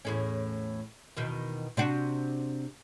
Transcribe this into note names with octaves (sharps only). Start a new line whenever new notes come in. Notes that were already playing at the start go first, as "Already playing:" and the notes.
E2 A2 C#4
E2 B2 D#3
C3 D4 F#4